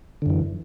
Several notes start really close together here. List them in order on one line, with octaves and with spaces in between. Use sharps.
D3 F#2 E3